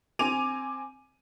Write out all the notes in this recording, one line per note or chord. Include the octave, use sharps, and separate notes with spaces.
C4 G#5 D6 D#7 F7